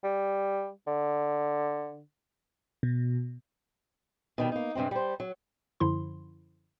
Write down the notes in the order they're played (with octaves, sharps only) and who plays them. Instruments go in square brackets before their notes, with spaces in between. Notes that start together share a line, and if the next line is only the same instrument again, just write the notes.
[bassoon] G3
D3
[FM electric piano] B2
[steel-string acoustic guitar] B2 D#3 G3
A#3 D#4
G2 C3 G#3 C4
G3 C5
F#3
[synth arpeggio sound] F#2 D3 F3 E4 C6